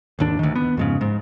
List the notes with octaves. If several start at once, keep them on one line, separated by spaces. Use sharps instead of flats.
G#1 D#2 D4
D2 D#3
B3
F2 G#2 C#3
G#2